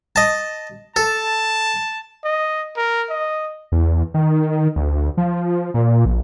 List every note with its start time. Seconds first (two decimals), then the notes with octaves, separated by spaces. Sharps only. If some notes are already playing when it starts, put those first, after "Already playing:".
0.16 D#5 A5
0.96 A4 A5
2.24 D#5
2.77 A#4
3.09 D#5
3.72 E2
4.14 D#3
4.76 D2
5.17 F3
5.74 A#2
6.05 A#1